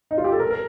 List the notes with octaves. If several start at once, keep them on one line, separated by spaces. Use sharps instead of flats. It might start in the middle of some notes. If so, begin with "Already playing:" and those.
D#4
F4
G4
A4
A#4
A#4